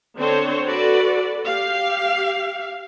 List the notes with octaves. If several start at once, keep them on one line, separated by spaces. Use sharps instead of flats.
D3 C4 D4 C5 C#5
F#4 A4 B4 D5
G4 F5